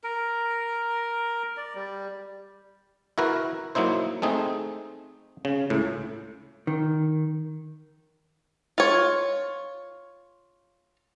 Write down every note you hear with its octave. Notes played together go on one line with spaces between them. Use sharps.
A#4
D5
G3
E4 F#4 A#4 B4
F#3 A#3 D#4 E4 C5
A3 C4 D#4 G#4
C#3
C#2 A2
D#3
F4 C#5